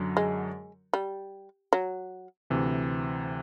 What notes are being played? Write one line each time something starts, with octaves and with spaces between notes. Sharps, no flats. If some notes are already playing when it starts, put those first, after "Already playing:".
Already playing: F#2 D3 F#3
G#3
G3
F#3
D2 C3 E3